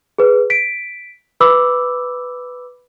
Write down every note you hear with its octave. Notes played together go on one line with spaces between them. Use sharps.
G#4 B4
B6 D7
B4 B5 D6 E6